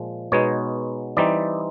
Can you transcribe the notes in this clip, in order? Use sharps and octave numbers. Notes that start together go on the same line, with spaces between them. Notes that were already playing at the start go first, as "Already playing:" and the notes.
Already playing: A#2 F3 G#3
B2 G#3 B3 D#4 C#5
E3 G3 C4 D#4 D5